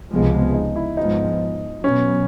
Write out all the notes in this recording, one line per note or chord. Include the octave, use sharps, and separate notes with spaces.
C#2 C3 F3 G#3 B3
D#4
E4
G#2 F3 G#3 B3 D#4
B2 F#3 B3 C#4